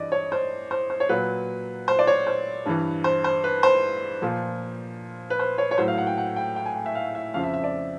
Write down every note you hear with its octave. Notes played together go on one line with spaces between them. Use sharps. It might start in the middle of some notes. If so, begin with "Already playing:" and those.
Already playing: G2 E3 D5 D#5
C#5
C5
C5
C5
C#5
A#2 F#3 B4
C5
D5
C#5
C5
G2 E3
C5
C5
B4
C5
A#2 F3
B4
C5
C#5
C#5
A2 F#3 C5
F5
F#5
G5
F#5
G5
G5
G#5
G5
E5
F5
E5
F2 C#3 F3 F5
E5
E5
D5